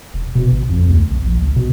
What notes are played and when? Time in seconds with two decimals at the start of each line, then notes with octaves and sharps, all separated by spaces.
0.14 E1
0.35 B2
0.52 G#1
0.70 F2
0.89 D2
1.10 B1
1.24 A#1
1.42 C#2
1.56 B2